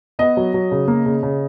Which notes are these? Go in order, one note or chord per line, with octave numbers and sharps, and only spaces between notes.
B3 D#5
F#3
F#3
C#3
A#3
C#3
C#3